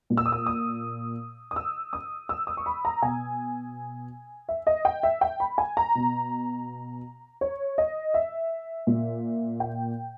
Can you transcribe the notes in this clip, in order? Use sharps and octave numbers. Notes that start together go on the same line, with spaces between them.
A#2
E6
D#6
E6
D#6
D#6
E6
D#6
E6
D#6
C#6
B5
A#5
B2 G#5
E5
D#5
G5
E5
G5
B5
G#5
A#5
B2
C#5
D#5
E5
A#2
G5